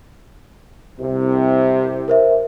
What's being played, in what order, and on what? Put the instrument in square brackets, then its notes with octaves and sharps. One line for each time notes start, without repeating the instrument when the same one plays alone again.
[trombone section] C2 C3
[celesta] A#4 C5 E5